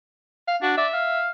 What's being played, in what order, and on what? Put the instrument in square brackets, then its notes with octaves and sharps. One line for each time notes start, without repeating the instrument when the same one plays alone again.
[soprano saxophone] F5
[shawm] D4 [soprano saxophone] F#4
[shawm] D5 [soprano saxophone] E5
[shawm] F5